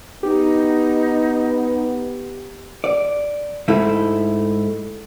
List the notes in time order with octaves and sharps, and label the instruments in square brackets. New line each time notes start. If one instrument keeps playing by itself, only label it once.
[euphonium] B3 [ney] D#4 [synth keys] G4
[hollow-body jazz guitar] D5
G#2 G#3 A3 E4